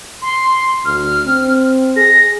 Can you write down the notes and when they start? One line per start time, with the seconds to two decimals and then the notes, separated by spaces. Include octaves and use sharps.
0.22 C6
0.85 D2 F6
1.26 C4
1.97 G#4 A#6